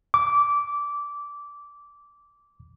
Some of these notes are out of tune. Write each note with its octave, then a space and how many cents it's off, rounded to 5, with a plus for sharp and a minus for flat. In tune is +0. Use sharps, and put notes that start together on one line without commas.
D6 -15